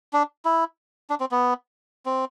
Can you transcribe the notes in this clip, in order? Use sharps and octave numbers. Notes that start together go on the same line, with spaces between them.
D4
E4
D4
C4
B3
C4